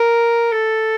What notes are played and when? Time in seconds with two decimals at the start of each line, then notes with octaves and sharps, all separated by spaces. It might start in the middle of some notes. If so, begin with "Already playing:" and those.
Already playing: A#4
0.52 A4